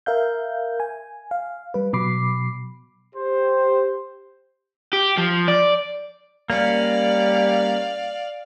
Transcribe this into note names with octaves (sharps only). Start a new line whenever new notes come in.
A#4 E5 F5 G6
G#5
F5
G3 B4
B2 F#3 B5 D6 C7
G4 C5
G4
F3
D5
G3 A#3 C#4 D5 F5